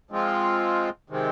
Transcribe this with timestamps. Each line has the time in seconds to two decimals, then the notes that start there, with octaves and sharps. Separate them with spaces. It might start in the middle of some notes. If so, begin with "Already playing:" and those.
0.11 F3 G#3 C4 F4
1.10 C3 D#3 G#3 C4